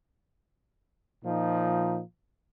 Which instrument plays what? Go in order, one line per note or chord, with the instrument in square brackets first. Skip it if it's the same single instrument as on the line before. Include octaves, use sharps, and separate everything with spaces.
[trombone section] A#2 F3 D#4